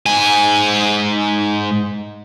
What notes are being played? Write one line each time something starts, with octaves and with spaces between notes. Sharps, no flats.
G#2 G#5